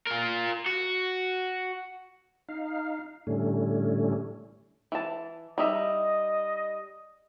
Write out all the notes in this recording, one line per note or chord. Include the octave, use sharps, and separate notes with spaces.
F4 A#4
F#4
D#4 F5
A2 D3 G3 A3 C#4
E3 A5
G3 D#4 D#5 E5